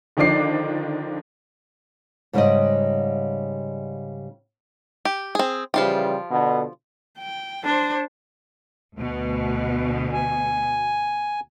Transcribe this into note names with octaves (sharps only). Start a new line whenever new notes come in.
D3 D#3 F3 D4 D6 C7
G#2 C#3 G3 D#4 D5 D#5
G4
C4 G#4
C#3 E3 F3 G3 F4 G4
B2 D3
G5
D4 C5
D2 B2
G#5